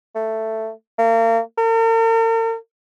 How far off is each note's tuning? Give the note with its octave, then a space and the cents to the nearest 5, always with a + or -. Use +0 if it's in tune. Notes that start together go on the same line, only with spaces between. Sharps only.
A3 +5
A#3 -35
A#4 -45